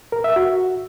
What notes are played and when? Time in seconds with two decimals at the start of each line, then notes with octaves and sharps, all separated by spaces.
0.12 A#4
0.24 E5
0.36 F#4